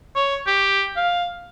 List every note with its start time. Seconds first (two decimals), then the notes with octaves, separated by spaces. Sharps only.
0.16 C#5
0.47 G4
0.97 F5